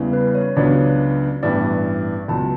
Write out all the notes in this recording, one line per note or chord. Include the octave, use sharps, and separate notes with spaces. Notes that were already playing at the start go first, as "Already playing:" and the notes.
Already playing: E2 C#3 E3 G3
B4
C#5
C#2 C#3 F#3 B3 D4 D5
A1 G2 E3 B3 E4 D5
C#2 B2 F#3 A5